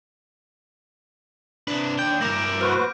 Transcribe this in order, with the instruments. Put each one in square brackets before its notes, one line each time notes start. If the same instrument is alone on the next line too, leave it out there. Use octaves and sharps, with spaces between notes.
[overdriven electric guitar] C3 B4 [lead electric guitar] D4
[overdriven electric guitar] D#2 G5 [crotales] G6
[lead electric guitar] G2 A#3 [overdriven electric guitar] E4 A#4 [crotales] D6 A#6
[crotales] D7
[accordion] F#4 B4 C5 [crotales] F6